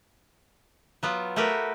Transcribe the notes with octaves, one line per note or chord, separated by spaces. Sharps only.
F#3 B3 F4
A3 F#4 G4 A#4 B4